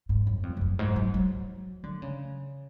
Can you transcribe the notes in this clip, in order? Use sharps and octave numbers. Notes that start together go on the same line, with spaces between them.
G#2
F#2
F2
G#2
F#2
G#2
F#3
F#3
D3
C#3